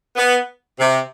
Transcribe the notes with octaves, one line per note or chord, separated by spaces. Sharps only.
B3
C3